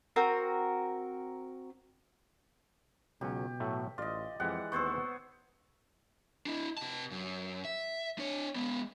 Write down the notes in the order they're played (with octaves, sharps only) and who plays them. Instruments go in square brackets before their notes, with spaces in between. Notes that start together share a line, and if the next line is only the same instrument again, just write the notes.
[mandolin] C4 F#4 A#4
[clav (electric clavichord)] C#2 F#3 C#4 [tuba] B2 [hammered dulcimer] G4
[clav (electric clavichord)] A2 F#3 A3
[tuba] A1 [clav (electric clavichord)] F4 [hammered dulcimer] D5 D#5
[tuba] F2 [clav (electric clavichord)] E3 G#3 G4 [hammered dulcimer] F#5
[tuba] D#2 [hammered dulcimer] B3 C5 C#5 [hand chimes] C#6 E6
[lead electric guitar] D4 E4
C3 A5
F#2
E5
D4 C#5
G#3 B3